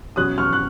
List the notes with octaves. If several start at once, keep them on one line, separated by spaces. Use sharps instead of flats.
B2 F#3 C#4 D#6 F#6
C#6 F6
F#6